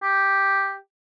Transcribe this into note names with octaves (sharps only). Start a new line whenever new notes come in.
G4